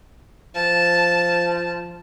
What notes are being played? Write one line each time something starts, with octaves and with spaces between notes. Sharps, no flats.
F3 A5